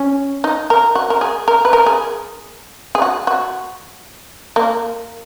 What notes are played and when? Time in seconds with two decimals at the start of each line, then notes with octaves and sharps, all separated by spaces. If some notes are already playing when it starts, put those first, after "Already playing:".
Already playing: C#4
0.44 D#4
0.70 A#4
0.95 F#4
1.10 A#4
1.21 G#4
1.48 A#4
1.65 B4
1.73 A#4
1.86 G#4
2.95 G#4
3.02 F#4
3.27 F#4
4.56 A#3